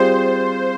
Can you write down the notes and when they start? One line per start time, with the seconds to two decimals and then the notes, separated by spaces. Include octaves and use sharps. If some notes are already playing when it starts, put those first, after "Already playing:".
Already playing: G3 C4 F4 G#4 C5